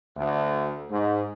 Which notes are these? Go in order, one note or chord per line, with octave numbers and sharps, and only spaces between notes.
D2
G#2